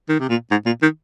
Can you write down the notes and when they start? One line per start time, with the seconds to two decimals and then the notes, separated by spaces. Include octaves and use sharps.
0.09 D#3
0.20 C3
0.29 A#2
0.51 G#2
0.66 A#2
0.82 D#3